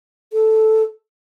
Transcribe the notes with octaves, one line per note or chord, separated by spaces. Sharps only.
A4